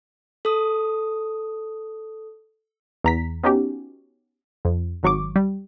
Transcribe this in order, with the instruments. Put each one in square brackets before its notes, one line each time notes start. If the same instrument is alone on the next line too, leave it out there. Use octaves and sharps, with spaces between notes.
[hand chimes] A4 D#6
[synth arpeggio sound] E2 A#5 B6
B3 C#4 D#4 F#4 G4
F2
G#1 F#3 C#6 D6
G3